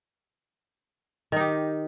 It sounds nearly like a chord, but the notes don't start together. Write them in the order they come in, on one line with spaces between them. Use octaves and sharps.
D#3 D#4 G4